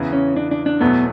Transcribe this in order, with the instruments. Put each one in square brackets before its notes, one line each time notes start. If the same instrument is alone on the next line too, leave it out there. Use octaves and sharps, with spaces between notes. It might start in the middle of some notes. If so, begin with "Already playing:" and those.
Already playing: [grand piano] E2 C#3 E3
[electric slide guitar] C#4
D4
D4
D4
[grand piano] E2 B2 F#3 A3 [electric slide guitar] B3